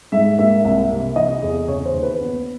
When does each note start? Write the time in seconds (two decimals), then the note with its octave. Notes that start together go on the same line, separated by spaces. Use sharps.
0.12 G#2 E5
0.38 A#3 E5
0.65 C2 E5
0.90 C3
1.16 E3 D#5
1.43 E2
1.68 C#3 C#5
1.85 C5
1.95 D#2
2.03 B4
2.20 B3